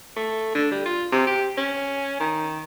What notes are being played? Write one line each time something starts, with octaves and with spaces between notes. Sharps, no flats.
A3
D3
G3
F4
C3
G4
C#4
D#3